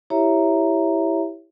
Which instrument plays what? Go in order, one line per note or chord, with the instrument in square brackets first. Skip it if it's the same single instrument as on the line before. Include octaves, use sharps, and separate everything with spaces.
[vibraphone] E4 G4 C#5 E5 A#5